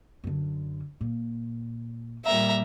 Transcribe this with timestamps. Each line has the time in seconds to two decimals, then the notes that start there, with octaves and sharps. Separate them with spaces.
0.24 F#2 D3
1.01 A#2
2.25 A#2 G3 A#3 E5 A#5